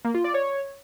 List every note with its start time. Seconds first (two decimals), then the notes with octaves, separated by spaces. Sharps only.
0.05 A#3
0.14 F4
0.24 D5
0.34 C#5